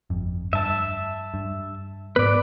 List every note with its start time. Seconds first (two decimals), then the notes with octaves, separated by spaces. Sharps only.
0.10 G1 F2
0.53 G2 E5 A5
1.34 G2
2.16 G#2 B3 B4 D5